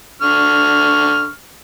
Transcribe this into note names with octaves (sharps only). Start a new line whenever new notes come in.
D3 C#6 F6